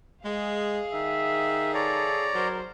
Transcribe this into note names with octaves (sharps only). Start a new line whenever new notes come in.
G#3 G#4 F5
D#3 E5
A4 C#5 D5 A#5
F#3 A#4 C5